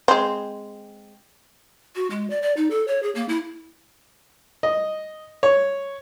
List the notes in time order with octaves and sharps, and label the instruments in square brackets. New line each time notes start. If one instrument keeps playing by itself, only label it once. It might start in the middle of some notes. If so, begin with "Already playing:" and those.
[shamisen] G#3 C4
[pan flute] F#4
G#3
D5
D5
D#4
A4
C#5
G#4
A#3
E4
[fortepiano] D#5
C#5